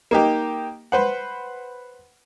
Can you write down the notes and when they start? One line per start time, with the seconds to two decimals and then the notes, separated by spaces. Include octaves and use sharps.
0.11 A#3 D#4 G4
0.92 B4 C5 F#5